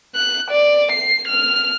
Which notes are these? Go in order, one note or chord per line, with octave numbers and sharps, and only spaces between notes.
F#6
D5
C7
F6